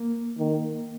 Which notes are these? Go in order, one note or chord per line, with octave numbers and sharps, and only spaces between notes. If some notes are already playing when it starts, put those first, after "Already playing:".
Already playing: A#3
D#3